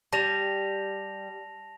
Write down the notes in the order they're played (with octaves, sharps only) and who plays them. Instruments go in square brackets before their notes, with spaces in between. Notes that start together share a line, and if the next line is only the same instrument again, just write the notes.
[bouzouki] G3 [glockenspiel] A5 A#6 F7